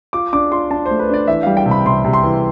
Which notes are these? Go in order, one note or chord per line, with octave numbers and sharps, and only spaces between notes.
F4 D6
D4 D6
F4 C6
D4 A5
C5
A3
B4
D4 D5
E3 E5
G3 F5
G5
C3
B5
C3 C6
C3
C6
E3